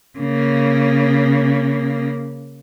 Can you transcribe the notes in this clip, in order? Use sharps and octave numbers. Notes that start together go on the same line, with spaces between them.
C#3 A#3